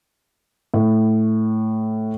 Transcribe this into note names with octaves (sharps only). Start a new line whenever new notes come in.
A2